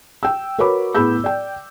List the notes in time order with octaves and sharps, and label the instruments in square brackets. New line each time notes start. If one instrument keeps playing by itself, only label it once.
[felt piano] G5 E6
F#4 A#4 B4 C#5 B5 D6
A2 B3 G#4 B5 E6 G6
D5 G5